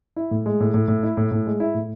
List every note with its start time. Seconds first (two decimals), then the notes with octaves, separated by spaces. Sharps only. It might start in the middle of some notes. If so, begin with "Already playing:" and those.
0.16 E4
0.31 A2
0.46 G#3
0.60 A2
0.74 A2
0.88 A2
1.03 E4
1.17 A2
1.31 A2
1.47 G#3
1.60 E4
1.74 A2